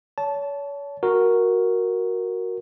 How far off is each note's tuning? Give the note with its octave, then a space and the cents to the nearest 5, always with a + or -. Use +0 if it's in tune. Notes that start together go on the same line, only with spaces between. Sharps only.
C#5 +35 A5 -10
F#4 -5 A#4 +0